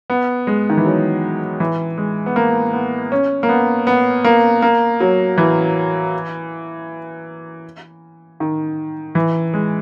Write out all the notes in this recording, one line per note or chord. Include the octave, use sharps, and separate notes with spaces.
B3
G#3
D#3
E3
F#3
E3
G#3
B3
A#3
B3
C#4
A#3
B3
B3
A#3
A#3
F#3
E3
D#3
E3
G#3